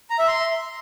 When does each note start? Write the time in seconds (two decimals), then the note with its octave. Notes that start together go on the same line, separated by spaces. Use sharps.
0.10 A#5
0.19 E5
0.27 C6